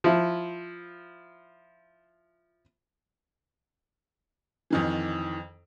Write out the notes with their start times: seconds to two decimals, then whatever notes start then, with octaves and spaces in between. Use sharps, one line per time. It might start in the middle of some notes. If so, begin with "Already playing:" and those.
0.04 F3 E4
4.70 F2 D#3 E3